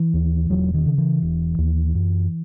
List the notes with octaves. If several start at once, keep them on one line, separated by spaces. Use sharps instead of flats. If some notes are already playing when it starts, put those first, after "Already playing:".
Already playing: E3
D#2
E1 F#3
D#3
C#3
E3
E1
D#2
F#2